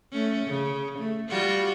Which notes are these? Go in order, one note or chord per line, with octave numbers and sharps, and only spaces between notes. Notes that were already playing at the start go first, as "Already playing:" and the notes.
A3 C#4
C#3
A3
G3 F4 F#4